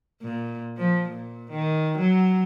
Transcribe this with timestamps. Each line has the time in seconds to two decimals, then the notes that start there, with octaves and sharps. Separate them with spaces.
0.22 A#2
0.77 F3
1.09 A#2
1.51 D#3
1.98 F#3